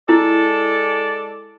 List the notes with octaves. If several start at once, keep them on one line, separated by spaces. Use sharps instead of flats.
G#3 E4 A4 D5